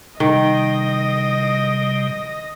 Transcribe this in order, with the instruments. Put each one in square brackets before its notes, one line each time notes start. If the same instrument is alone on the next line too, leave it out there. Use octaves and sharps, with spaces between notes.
[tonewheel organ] C3 G3 [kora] D#3 [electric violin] D#5